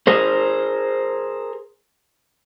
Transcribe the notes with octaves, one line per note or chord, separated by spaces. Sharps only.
G#4 A#4 C5